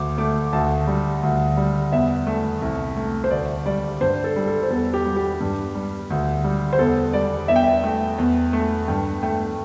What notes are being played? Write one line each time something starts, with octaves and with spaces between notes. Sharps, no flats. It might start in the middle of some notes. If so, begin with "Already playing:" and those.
Already playing: D2 D6
A3 D6
D2 A5
G3
D2
G3
E2 E5
A3
C2
A3
C5
D2 D5
G3 D5
G2 C5
A4
G3
A4
C5
E2 A4
G4
G3
G4
G2
G3
D2
G3
C5
E2 A4
G3 D5
E2 E5
G5
E5
A3
E2
A3
G2 G5
A3 G5